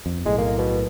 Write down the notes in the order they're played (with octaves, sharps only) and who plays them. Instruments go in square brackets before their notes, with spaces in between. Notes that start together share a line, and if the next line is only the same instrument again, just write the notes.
[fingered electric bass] F2
[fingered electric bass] B1 A2 [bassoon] G#3
[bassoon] A#3
B2